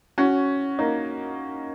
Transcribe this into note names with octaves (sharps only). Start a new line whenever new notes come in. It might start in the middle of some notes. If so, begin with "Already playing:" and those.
C#4 F#4
A#3 D#4